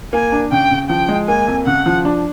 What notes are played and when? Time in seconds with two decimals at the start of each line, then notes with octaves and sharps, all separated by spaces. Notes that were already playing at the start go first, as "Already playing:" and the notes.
0.13 A#3 G#5
0.32 D4
0.52 C#3 G5
0.71 C#3
0.89 F3 G5
1.09 G#3
1.28 A#3 G#5
1.48 F2
1.66 C#3 F#5
1.86 F3
2.05 D4